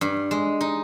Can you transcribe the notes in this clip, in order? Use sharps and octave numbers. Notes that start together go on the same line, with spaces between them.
G2
G#3
D#4